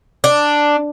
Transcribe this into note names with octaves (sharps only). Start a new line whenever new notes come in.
D4